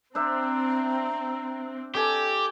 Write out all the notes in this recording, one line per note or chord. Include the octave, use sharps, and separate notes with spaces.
C4 D4 C5 E5 A#5
G4 A4 D5 G#5 A5